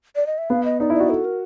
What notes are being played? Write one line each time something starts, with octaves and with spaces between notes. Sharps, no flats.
D5
D#5
E5
B3 F5
D#5
D#4 D5
E4
D5
F#4
A4
A#4